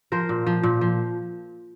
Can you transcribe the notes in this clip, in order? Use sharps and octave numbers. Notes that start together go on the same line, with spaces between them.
F3 A#4 C5
A#2
F3
A#2
F3